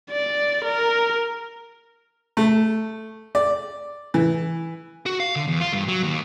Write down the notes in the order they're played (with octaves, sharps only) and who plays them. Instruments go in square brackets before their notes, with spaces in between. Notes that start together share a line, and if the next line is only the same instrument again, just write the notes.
[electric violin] D5
A#4
[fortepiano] A3
D5
E3
[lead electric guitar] F#4
F5
D3
E2
F4
G2
F#3
D#2